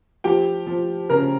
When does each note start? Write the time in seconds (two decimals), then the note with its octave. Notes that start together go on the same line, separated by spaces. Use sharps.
0.24 F3 G4 G5
0.67 F3
1.10 C#3 A#4 A#5